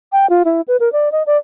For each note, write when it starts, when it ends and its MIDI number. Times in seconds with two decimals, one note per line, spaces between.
0.12 0.29 79
0.30 0.43 65
0.45 0.61 64
0.68 0.77 71
0.80 0.92 70
0.92 1.11 74
1.12 1.23 75
1.26 1.37 74